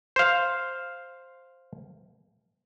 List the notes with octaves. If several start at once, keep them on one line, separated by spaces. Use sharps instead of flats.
C5 F5